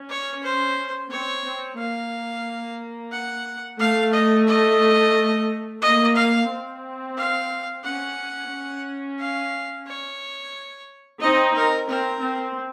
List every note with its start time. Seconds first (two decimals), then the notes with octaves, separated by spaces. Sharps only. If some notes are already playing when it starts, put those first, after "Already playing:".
Already playing: C#4
0.09 C#5
0.43 C5
1.10 C4 C#5
1.44 C4
1.78 A#3 F5
3.12 F#5
3.79 A3 F5
4.13 D#5
4.47 D#5
5.82 A#3 D#5
6.16 F5
6.49 C4
7.17 F5
7.84 C#4 F#5
8.51 C#4
9.19 F5
9.87 C#5
11.21 C4 D#4 D#5
11.55 A#4
11.89 C4 A#4
12.22 C4